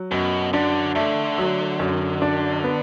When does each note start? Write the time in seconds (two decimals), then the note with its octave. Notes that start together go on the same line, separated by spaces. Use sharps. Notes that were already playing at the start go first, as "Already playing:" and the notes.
Already playing: F#3
0.11 F#2 B2
0.53 D3 D4
0.95 D3 A3
1.38 F#3
1.80 F#2
2.22 D4
2.64 B3